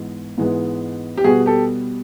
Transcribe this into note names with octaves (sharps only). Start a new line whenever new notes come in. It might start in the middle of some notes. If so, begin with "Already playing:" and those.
Already playing: G#2 E3 G#3 B3
G#2 E3 G#3 B3
G4
B2 G3 B3 F#4 G#4
G4 A4